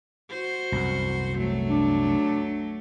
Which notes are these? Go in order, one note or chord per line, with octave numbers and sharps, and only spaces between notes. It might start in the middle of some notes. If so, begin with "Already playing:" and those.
F#4 C5
C2 F#2
F#3 A3
D4